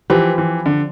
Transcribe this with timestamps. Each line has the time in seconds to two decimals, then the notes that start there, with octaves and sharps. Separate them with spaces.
0.10 E3 F3 C4 G4 B4
0.38 E3
0.66 D3